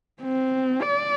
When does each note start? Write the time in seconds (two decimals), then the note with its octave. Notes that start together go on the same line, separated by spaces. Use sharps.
0.22 C4
0.82 D5